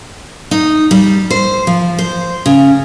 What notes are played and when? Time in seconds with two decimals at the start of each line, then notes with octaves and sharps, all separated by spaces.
0.51 D#4
0.91 G3
1.30 C5
1.67 F3
1.98 C5
2.46 C#3